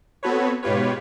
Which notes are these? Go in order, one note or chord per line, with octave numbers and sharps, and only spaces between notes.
B3 C4 F#4 A4 B4 C#5
G#2 B2 F4 G4 B4 C#5